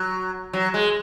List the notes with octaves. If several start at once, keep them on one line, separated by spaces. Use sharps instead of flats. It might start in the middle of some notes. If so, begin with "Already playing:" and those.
Already playing: F#3
F#3
G#3